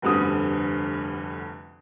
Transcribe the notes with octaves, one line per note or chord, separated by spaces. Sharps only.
F1 D2 G2 D3 D#6